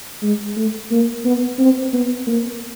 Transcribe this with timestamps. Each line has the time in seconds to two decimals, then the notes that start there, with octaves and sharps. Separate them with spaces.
0.23 G#3
0.57 A3
0.91 A#3
1.25 B3
1.59 C4
1.93 B3
2.27 A#3